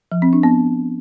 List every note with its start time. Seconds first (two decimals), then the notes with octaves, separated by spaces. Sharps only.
0.12 F3
0.22 C4
0.33 D4
0.43 B3